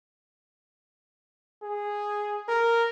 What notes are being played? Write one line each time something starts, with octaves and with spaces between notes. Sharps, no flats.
G#4
A#4